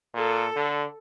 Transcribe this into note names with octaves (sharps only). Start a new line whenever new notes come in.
A#2 A4
D3